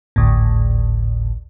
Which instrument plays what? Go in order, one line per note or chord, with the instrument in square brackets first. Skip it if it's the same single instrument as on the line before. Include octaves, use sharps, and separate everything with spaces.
[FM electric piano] G#1 D2 A2